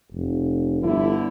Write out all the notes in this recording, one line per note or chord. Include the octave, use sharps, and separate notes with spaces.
F1
G1 D3 E4